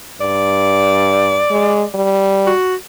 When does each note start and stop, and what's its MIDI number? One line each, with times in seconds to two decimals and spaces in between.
0.21 1.44 43
0.21 1.94 74
1.50 1.83 56
1.94 2.51 55
2.47 2.75 66